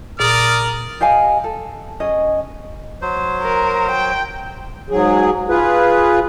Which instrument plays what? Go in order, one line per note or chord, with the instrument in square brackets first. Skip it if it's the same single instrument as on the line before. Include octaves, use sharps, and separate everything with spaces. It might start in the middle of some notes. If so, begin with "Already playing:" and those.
[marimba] A#2 [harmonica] A#4 D#6 F6 [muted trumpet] D5
[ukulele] G4 D#5 F5 G#5
A4
C#4 G#4 D#5
[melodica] F#3 C5
[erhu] A#4
G5
[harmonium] G#2 F#3 G#4
F4 G#4 B4